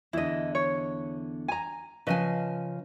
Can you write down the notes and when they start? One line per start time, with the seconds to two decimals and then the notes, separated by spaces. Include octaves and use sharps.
0.13 E2 D3 E4 D#5
0.55 C#5
1.48 G#5 A#5
2.07 C#3 F3 B4 D#5 G#5